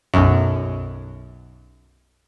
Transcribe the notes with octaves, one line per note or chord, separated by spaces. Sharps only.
B1 F#2